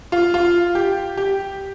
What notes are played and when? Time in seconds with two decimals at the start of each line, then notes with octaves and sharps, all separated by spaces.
0.12 F4
0.34 F4
0.75 G4
1.17 G4